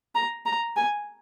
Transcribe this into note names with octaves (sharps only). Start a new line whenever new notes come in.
A#5
A#5
G#5